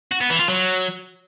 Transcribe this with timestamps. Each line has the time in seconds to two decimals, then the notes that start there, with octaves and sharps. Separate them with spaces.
0.11 F#4
0.21 B3
0.30 E3
0.39 F4
0.48 F#3